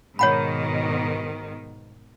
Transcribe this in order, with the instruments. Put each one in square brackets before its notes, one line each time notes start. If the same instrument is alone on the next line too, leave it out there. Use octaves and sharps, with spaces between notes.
[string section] G#2 B2 D#3 [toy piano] C#5 F#5 B5